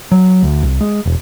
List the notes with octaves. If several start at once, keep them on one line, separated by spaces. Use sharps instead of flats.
F#3
D2
C2
G#3
E1